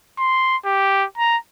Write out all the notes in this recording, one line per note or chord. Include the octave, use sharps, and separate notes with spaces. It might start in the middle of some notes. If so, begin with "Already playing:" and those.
C6
G4
A#5